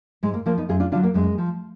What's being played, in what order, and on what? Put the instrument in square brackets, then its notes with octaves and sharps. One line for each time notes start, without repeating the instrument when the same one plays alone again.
[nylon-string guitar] G#2 G#3
A#3
F3 A#3 D4
B3 D#4
F#2 F4 G#4
D4 F4
D3 F#3 D4 F4
A#3
F#2 G#3
F3